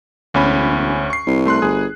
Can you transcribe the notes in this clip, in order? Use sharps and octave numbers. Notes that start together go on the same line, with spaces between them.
E1 D2 C#4 B5
C#6 C7
C2
A3 C6 F#6
G1 G#4